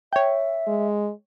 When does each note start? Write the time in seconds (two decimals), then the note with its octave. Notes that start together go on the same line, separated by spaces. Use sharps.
0.13 C#5 E5 G5
0.68 G#3